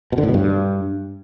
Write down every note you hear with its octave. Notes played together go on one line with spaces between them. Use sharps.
B2
D3
A2
B2
G2